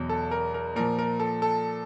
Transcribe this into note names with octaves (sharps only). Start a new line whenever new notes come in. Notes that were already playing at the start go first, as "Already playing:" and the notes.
Already playing: E2 B2 F#3
A4
A#4
A#4
A#2 F3 A#4
A#4
A4
A4